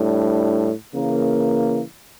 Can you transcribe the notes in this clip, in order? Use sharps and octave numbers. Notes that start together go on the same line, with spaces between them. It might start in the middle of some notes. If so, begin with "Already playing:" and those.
Already playing: A2 G3 D4
C#3 E3 A#3